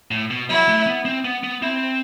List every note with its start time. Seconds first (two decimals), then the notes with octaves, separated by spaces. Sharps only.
0.11 A2
0.30 B2
0.50 F#3 E4
0.68 A3
0.87 B3
1.05 C4
1.25 B3
1.44 B3
1.62 C4 E4